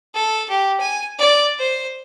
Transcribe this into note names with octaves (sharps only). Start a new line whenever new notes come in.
A4
G4
G#5
D5
C5